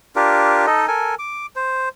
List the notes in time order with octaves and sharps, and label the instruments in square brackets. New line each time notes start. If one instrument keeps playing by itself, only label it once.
[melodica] D4 F4 G4 A#4
D#4 A4 D#5
A4 A#4 G#5
D6
C5